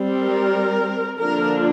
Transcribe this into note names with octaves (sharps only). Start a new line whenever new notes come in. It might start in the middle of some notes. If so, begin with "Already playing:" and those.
Already playing: G3 C4
A#4
D3 F3 A#3 D4 A#4